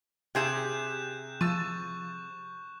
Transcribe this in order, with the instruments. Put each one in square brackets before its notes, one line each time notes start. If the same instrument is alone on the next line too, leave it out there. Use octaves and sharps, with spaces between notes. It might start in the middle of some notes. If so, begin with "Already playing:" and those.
[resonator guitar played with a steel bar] C3 G#4 E5 [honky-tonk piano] G4 [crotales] F#6 G6 E7
[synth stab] F3 [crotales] C#6 [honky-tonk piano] E6 A6 D#7